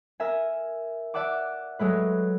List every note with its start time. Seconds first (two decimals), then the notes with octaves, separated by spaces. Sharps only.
0.20 A#4 E5 G#5
1.14 D5 E5 F#5 A5 D6
1.79 F#3 G#3 A3 B4